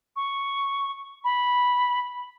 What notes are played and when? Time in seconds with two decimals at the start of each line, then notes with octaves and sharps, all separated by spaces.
0.16 C#6
1.24 B5